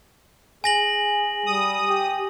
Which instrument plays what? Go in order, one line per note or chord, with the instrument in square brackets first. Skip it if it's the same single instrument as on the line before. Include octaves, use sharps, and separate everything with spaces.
[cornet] G#4 [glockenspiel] G#5 A#6 F#7
[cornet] G3 [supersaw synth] D#6
[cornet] G4